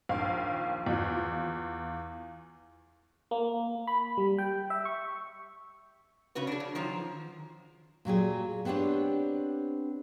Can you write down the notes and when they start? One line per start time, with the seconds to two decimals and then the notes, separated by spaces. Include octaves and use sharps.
0.09 A#1 D#2 F5
0.86 E2 F4
3.31 A#3
3.87 B5
4.17 G3
4.38 G5
4.70 E5
4.85 C#6
6.35 C#3 C#4 F#4 B4
6.47 D4 G#4
6.60 C#3
6.75 D#3 F3 F#3
8.05 A#2 F#3 G4 G#4
8.65 B3 C4 D4 G4 C#5